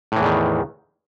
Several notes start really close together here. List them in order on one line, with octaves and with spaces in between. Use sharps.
A2 E3 E2 D#3